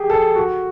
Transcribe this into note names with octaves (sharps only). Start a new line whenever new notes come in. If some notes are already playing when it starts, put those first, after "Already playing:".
Already playing: G4 G#4
A4
F#4